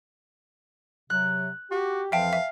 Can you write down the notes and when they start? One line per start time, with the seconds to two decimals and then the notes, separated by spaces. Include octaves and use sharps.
1.10 C3 F#3 F#6
1.71 F#4 G4
2.12 F2 E3 F3 E5 F5 G5 A5
2.33 E5